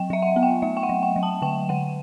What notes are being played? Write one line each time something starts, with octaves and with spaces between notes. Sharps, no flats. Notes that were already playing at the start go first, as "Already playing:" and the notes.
Already playing: F#3 G5
F#3 E5
F#5
B3
G5
A3 E5
G5
F#5
F#3
G5
F#3
A5
D3 G5
D3 F#5